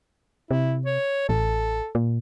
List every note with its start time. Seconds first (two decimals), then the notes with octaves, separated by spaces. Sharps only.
0.51 C3 E4
0.86 C#5
1.29 A1 A4
1.95 A#2